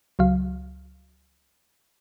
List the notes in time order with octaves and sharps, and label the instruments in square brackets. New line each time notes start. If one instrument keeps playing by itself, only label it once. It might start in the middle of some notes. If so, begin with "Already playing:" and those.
[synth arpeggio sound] C#2 F#3 F5